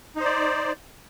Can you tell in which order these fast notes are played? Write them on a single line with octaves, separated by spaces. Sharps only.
D#4 C5 D5